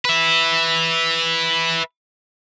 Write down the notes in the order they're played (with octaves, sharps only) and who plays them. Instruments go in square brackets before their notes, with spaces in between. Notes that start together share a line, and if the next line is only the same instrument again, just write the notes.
[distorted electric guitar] B4 E5